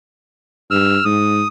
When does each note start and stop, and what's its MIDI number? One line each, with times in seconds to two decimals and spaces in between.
0.71 0.98 43
0.71 1.04 88
0.71 1.04 89
1.05 1.42 44
1.05 1.48 87